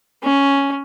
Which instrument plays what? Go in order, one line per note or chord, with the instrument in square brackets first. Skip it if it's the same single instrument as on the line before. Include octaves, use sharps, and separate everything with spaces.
[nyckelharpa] C#4